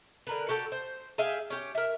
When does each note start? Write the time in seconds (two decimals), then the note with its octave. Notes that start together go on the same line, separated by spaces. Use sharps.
0.27 D3 A#4 B4
0.49 F#4 G4 A4 F#5
0.72 C5
1.18 G#4 E5 F5 G5
1.50 C#4 G4
1.75 A#4 E5